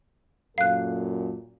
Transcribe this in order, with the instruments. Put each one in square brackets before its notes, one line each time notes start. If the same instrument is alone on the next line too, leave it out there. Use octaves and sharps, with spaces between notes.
[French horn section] F#2 A#2 A4 [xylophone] F5 F#6